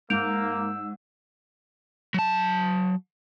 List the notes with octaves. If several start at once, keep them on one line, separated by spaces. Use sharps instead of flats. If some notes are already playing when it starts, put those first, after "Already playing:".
G#2 A#3 E6 G6 D7 F7
F#3 A5